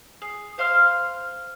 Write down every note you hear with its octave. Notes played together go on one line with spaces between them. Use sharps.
G#4
C5 F5 C6 F6